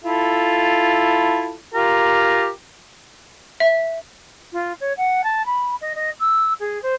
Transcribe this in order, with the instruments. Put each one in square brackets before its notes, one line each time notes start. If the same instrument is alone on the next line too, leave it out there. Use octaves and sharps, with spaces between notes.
[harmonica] E4 F4 A4
F4 G4 A#4
[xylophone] E5
[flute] F4
C#5
F#5
A5
B5
D#5
D#5
E6
G#4
C5